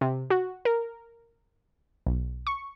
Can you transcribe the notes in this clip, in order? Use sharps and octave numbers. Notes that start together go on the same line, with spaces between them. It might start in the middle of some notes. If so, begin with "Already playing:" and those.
C3
F#4
A#4
B1
C#6